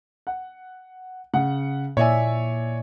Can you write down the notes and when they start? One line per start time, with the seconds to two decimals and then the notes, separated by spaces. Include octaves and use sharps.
0.27 F#5
1.34 C#3 F#5
1.97 A#2 E4 C#5 D5 E5 G#5